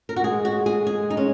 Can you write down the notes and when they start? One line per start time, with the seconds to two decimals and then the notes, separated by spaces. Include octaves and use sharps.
0.09 A#4
0.16 F#4
0.24 G#3 G#4
0.45 F#4
0.66 G#4
0.87 G#4
1.10 D#4
1.17 C#4